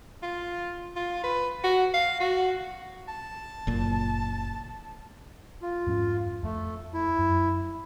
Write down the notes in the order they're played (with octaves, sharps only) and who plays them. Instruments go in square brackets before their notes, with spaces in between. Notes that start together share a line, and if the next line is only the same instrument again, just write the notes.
[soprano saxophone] F4
F4
B4
F#4
F5
F#4
A5
[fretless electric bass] F#1 A#2
[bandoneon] F4
[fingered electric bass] F2 G#2 C#4
[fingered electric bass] F2 [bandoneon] A3
[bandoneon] E4
[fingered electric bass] F#2